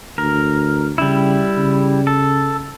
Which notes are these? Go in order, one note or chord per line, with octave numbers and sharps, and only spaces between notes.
D2 A#4
C#3 G3 E4
C#3
A4